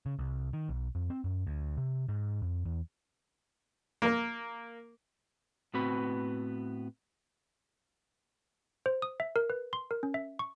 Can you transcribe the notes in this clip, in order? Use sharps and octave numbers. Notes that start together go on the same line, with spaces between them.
C#3
C2
D#3
B1
F2
C4
F#2
D2
C3
G#2
F2
E2
A#3 A#4
A2 B3 C4 F#4 B4 B5
C5
D#6
E5
A#4
B4
C6
A#4
C#4
E5
C#6